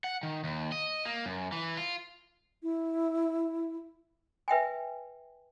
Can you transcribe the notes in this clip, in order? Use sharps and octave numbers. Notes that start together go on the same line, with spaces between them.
F#5
D#3
D#2
D#5
A#3
F#2
E3
F4
E4
B4 E5 G5 G#5